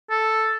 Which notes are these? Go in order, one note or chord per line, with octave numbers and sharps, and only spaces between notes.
A4